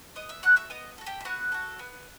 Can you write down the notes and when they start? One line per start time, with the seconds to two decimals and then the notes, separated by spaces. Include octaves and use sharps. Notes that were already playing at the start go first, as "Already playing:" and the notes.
0.16 B3 D#5 D#6
0.29 E5 E6
0.43 F#4 A4 F#5 F#6
0.56 E5 E6
0.70 B3 D#5 D#6
0.98 F#4 A4
1.06 G4 G5
1.21 E5
1.25 B3 F#4 F#5
1.52 F#4 A4
1.79 B3